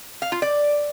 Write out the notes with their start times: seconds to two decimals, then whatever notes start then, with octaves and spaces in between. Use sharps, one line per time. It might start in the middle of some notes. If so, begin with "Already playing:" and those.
0.22 F5
0.32 F4
0.42 D5